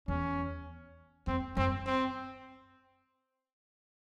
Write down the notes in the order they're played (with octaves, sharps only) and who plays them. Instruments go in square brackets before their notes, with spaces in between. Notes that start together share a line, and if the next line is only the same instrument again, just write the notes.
[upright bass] E2 [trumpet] C#4
[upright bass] F2 [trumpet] C4
[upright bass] F#2 [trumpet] C4
[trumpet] C4